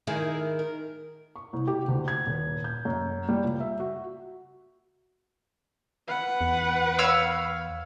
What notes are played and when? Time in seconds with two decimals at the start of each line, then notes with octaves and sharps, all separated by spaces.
0.07 D#3 E4 G#4 A#4
0.59 A#4
1.36 C#6
1.53 C2
1.67 G4
1.88 D2
2.08 G#6
2.26 D#1
2.64 G6
2.85 F#2
3.29 G3
3.43 C#2
3.60 E5
3.80 F#4
6.07 B4 F#5
6.41 E2
6.99 C#5 F5 E6